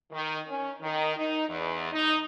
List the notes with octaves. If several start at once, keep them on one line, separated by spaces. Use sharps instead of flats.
D#3
C#4
D#3
D#4
E2
D#4